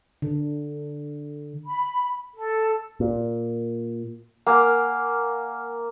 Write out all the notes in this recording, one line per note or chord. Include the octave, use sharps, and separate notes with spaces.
D3
B5
A4
A#2
A#3 F#5 G#5 F6